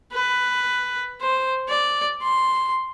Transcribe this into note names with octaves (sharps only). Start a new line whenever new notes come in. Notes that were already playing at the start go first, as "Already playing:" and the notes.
B4
C5
D5
C6